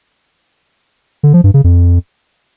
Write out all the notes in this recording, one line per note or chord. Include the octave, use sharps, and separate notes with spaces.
D3
F3
G2
C#3
F2